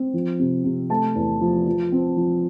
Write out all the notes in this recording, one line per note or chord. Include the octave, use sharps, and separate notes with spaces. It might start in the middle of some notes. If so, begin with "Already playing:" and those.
Already playing: C4
F3
C3
C3
A3 A5
E2
F3
F3
C4
F3